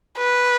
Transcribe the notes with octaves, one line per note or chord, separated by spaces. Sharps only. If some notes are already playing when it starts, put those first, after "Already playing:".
B4